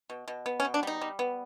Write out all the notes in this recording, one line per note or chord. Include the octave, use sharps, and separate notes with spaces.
B2
B2
B3
C#4
B2
D4
G3 D#4
G3
B3